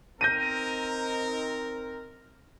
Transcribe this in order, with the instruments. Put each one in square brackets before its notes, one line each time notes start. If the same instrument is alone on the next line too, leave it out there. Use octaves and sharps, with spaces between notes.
[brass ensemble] C4 D#4 A#4 [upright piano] G6 A#6 D#7